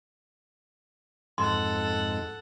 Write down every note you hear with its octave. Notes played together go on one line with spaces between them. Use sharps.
F2 G#2 A4 F#5 C6